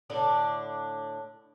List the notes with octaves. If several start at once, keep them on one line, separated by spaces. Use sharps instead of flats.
A2 D3 D4 D5